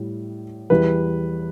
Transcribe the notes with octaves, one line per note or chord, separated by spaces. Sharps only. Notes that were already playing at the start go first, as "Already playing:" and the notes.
Already playing: A2 G3
E2 E3 G3 B4